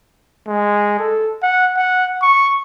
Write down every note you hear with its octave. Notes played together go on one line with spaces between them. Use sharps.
G#3
A4
F#5
F#5
C#6